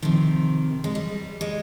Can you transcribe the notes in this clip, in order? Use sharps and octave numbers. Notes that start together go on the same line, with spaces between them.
C3 D#3 F3
G#3
G3
G#3